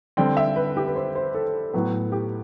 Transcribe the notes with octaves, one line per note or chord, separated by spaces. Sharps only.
D3 G3 C4 G5
E5
B4
G4
B4
C5
C5
A4
A2 F#3 B3
G4